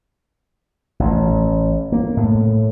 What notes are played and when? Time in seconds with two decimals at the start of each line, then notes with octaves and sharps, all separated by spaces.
1.00 A1
1.92 A#3
2.17 A2